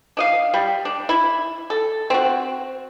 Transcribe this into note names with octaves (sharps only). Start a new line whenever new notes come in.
D4 D#5 F5
G3
D4
E4
A4
C4 F#4